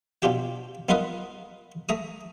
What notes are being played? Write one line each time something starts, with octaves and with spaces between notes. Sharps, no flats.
B2 D4 F4 G4 G5
B3 D#4 F4 A#4 B4 D#5
A3 A#5 D#6